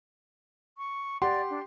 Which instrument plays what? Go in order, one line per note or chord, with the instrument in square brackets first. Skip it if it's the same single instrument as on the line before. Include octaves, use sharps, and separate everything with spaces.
[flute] C#6
[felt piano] G4 F#5 [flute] D5 [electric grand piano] C6
[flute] D4